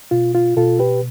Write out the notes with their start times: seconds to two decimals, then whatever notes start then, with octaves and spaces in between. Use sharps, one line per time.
0.11 B2 F4
0.35 F4
0.57 B2 F4 A4
0.79 G4 B4